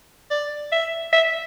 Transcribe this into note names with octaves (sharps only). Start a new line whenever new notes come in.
D5
E5
E5